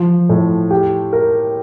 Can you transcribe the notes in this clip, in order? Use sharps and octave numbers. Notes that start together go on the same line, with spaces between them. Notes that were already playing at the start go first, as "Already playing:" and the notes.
Already playing: F3
A2
G4
A#4